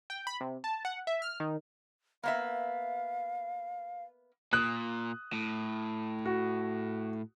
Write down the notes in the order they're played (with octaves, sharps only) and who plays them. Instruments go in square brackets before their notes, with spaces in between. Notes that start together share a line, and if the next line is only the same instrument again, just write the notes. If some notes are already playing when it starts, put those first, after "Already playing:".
[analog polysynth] G5
B5
C3
A5
F#5
E5
F6
D#3
[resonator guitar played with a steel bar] A#3 B3 E5 [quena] F5
[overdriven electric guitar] A#2 [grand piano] D#6 F#6
[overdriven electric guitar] A2
[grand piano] F#4